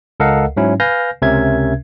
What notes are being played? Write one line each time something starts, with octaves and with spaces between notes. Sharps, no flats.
C#2 A4 A#4 D#5 F5 F#5
G#2 F#3 C#4 E4
B4 F5 G#5 F6 G6 A#6
C#2 C3 C#4 A#4 E5 G#6